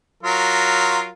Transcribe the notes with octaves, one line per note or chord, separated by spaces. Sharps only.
F#3 F4 A#4